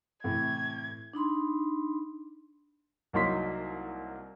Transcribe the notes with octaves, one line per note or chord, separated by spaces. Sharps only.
A2 C3 E3 G#6
D4 D#4 B5 C6
C2 F#3 A#3 D#4 C6 B6